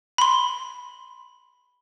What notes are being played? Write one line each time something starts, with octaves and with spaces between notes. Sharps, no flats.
B5 C6